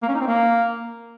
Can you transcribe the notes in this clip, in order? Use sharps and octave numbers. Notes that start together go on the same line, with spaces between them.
A#3
C#4
D#4
C4
A#3